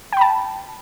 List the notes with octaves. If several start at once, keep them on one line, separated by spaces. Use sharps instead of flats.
G5 A5 B5